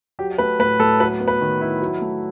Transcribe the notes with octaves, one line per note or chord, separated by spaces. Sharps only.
F#3 G4
A3 B4
A2 B4
A2 A4
F#3 B4
B3
B4
D#3
E4
F#3
A3